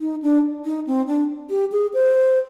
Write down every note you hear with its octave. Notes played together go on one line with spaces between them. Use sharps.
D#4
D4
D#4
C4
D4
G4
G#4
C5